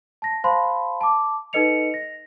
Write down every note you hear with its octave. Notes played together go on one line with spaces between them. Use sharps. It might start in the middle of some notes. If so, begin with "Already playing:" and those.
A5 A#6
C5 F5 A5 B5 C6
A5 D6
D#4 A4 B4 D#5 C#7 F7
A#6